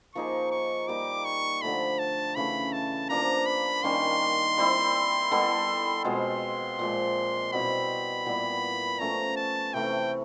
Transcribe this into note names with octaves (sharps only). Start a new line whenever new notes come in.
F3 A#3 D#4 G#4 C#6
C#6
G3 A#3 D#4 G4 D6
C#6
D3 F3 A3 B5
A5
C#3 E3 A3 B5
A5
F3 A#3 D4 A#5
B5
D#3 G3 A#3 C#4 C6
G3 C4 E4
G3 B3 E4 A4
B2 G#3 C4 F4 C6
A#2 F3 G#3
B2 G3 C4 E4 B5
A#2 G3 B3 E4
F3 A3 C#4 A#5
A5
C3 E3 A3 G5